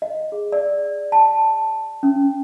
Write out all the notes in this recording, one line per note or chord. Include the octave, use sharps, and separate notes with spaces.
D#5
G#4
D5
A5
C#4